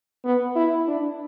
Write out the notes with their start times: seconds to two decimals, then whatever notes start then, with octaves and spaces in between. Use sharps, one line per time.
0.24 B3
0.56 E4
0.88 D4